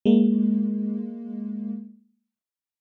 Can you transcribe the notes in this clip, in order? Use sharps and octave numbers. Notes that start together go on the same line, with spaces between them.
G#3 A#3